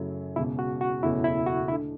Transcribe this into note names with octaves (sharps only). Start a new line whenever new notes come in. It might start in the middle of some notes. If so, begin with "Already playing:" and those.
Already playing: F#2 C#3 F#3 A3 E4
E1 E2 C#3 E4
F#4
F#4
F#1 E2 B2 A3 C#4 E4
E4
F#4
D2 D3 A3 E4